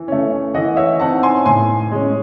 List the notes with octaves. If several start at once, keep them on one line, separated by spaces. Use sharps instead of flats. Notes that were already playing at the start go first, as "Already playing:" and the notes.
Already playing: E3
A3 C#4
E3 D#5 F#5
C#5 E5
C4 D#4 F#5 A5
G#5 C6
A2 G#5 C6
G#3 C#4